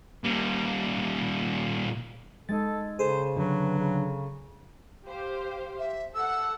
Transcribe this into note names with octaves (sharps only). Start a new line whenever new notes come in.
A#2 G3
G#3 D#4 A4 A6
C#3 G#4 A4 C5
D3 F#3 B4
C#3
G4 C5 F5
E5
A4 F#5 E6